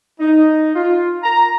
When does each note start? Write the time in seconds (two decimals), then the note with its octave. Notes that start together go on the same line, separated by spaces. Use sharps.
0.18 D#4
0.75 F4
1.23 A#5